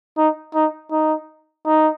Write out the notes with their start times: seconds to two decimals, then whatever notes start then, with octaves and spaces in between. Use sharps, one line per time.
0.17 D#4
0.54 D#4
0.91 D#4
1.66 D#4